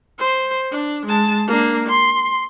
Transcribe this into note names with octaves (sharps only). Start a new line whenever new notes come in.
C5
D4
G#3 A5
A#3 D4
C6